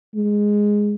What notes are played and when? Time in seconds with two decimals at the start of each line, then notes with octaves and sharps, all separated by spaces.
0.15 G#3